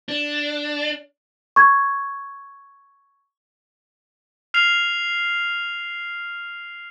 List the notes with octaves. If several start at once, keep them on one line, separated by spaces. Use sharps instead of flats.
D4
C#6 G#6
F6 C7 F7